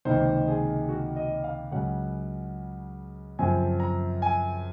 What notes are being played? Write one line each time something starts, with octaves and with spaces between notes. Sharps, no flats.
C#2 C3 D#3 A#3 D#4 C5
G#4
F#4
D#5
F5
C#2 C#3 F#3 C#4 F#5
F#2 C#3 F3 C4 G#5
A#5
G#5